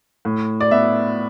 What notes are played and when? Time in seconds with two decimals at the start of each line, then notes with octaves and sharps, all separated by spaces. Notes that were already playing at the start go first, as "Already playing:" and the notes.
0.25 A2
0.60 D5
0.71 B3 E5